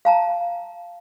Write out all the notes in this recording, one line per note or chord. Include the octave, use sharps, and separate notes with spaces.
F5 A5 A#5